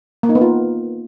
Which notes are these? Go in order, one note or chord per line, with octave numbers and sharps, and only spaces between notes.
A#3
D#4
B3
F4